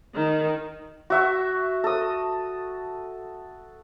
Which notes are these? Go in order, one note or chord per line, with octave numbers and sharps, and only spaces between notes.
D#3
F#4 E5 C#6
A4 D#6